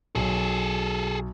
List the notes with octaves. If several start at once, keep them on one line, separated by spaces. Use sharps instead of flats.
B1 G#4 A4